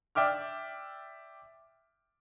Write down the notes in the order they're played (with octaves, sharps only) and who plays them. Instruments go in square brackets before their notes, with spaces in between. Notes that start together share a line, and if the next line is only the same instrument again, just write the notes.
[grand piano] D5 E5 G5 D6 F6